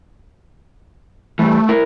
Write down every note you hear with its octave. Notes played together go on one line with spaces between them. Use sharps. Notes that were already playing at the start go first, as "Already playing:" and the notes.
E3 G3 A3
E4 A#4